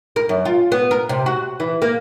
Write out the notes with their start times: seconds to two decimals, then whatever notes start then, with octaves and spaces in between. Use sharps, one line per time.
0.16 A#4
0.29 F#2
0.45 F4
0.72 B3
0.91 A#4
1.09 C3
1.26 F#4
1.60 E3
1.82 A#3